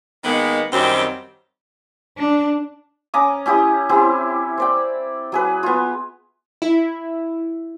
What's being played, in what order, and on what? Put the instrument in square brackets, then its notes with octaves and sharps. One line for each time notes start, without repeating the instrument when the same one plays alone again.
[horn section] D#3 G#3 A#3 B3
F#2 D#3 F#3 G3 C4
[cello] D4
[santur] C#4 A#5 D6 D#6
C#4 E4 G4 D#6
C4 C#4 E4 G4
C5 D5 G5
F#3 G#4 B4
B3 F4
[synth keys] E4